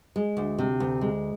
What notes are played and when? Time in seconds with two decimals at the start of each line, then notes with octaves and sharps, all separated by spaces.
0.16 G#3
0.37 D2
0.58 C3
0.80 D2
1.01 G#3